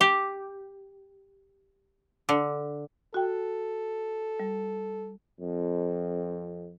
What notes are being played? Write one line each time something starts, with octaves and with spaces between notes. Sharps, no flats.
G4
D3
F#4 A4 G5
G3
F2